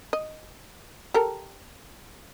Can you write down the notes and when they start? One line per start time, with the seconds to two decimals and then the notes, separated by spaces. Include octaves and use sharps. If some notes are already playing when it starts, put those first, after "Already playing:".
0.13 D#5
1.14 G4 A4 A#4